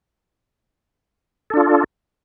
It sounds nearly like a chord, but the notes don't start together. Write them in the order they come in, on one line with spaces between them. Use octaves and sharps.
A4 D4 F4